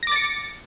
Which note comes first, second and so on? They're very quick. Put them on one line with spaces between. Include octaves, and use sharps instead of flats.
A#6 D6 A6 C#7